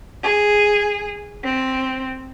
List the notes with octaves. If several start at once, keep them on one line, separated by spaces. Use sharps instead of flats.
G#4
C4